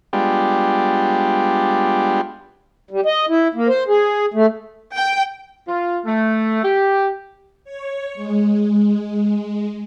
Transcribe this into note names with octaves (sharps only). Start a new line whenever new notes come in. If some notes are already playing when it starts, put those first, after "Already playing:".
G3 G#3 B3 D4 F4 G4
G3
D#5
E4
A#3
C5
G#4
A3
G5
F4
A3
G4
C#5
G#3